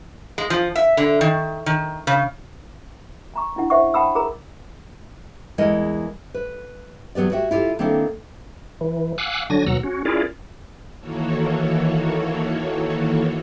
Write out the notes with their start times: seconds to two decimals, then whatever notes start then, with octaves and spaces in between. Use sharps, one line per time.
0.38 G#3
0.50 F3
0.76 E5
0.97 D3
1.21 D#3
1.66 D#3
2.07 C#3
3.34 G#5 A#5 C#6
3.56 C#4 D4 E4 F#5
3.70 C5 E5 F#5 C#6
3.94 F#5 G5 A5 B5 D#6 E6
4.15 G#4 A#4 A#5
5.58 E2 G#3 E4 A#4 D5 D#5
6.34 B4
7.15 E2 F#3 B3 G4 D5
7.32 F#4 G4 C#5 E5 G5
7.51 E4 F4 G4 A4
7.79 D#3 A#3 C4 D4 E4 A4
8.81 E3
9.18 F5 F#5 G#5 D6 E6 F#6
9.50 D3 F#3 D4 G#5 A#6
9.66 D#2 B2 F#3 F#5 A#5 E6
9.83 C#4 F#4
10.05 C#4 E4 F4 G#4 A#4 D5
10.99 D#3 E3 A#3 F#4 A4 C#5